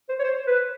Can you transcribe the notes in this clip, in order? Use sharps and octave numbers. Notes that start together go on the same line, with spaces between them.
C5
C#5
C5
B4